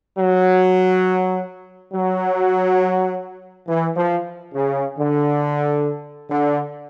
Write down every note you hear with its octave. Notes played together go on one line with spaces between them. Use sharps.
F#3
F#3
E3
F3
C#3
D3
D3